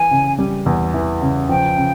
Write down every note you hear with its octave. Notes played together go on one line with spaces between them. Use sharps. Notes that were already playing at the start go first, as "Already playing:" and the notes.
Already playing: E3 G#5
C#3
G3
E2
E3
C#3
F3 G5
C#3